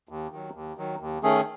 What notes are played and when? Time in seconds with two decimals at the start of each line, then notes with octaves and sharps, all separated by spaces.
0.09 D#2
0.32 D#3 F#3
0.54 D#2
0.77 D#3 F#3
1.00 D#2
1.23 D#3 A3 C#4 G#4